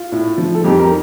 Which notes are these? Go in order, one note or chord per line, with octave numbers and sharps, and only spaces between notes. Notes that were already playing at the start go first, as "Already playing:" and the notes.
Already playing: F4
A2
F3
A4
F2 D#4 G4
A#4